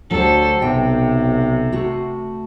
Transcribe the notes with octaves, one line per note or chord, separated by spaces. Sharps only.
D2 F#3 G4 A4 C5
B1 C3 G5
A3 F#4